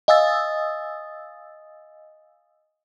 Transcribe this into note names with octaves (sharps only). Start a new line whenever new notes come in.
D#5 F5 G#5 D#6 E6 A6